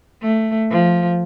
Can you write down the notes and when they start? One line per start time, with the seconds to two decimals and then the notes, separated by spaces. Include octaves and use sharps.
0.22 A3
0.71 F3